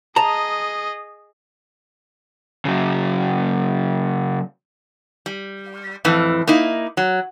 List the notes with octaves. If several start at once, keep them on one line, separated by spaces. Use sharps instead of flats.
G#4 D#5 A5 A#5
C#3 F#3
G3
F2 A2 E3
A#3 D#4 E4
F#3